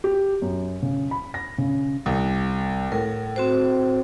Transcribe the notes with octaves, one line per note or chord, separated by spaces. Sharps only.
G4
F#2
C#3
B5
A#6
C#3
C2
A2 A#4
C4 F#4 C5